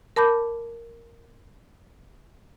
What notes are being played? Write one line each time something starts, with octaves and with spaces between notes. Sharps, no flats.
A#4 A5 B5 D6 G6